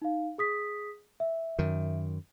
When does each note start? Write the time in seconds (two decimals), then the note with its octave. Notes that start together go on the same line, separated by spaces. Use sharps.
0.02 D#4 F5
0.38 G#4 D#6 B6
1.20 E5
1.59 F#2 D#3